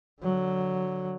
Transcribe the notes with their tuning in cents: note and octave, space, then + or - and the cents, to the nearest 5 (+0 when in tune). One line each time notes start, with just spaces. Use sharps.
D3 +0 F#3 +0